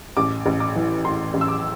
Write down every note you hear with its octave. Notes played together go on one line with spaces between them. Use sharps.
A1 D6
A1
D6
E3
A2 C6
A1
E6
D6